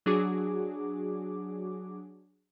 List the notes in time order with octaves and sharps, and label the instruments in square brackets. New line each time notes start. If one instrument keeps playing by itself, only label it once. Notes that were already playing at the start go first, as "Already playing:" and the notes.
[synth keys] F#3 D4 F#4 G#4 D6